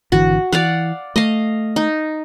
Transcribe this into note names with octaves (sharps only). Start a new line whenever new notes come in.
G#1 D3 E3 F#4
E3 D5 F5 F#5
A3 D#5 F5
D#4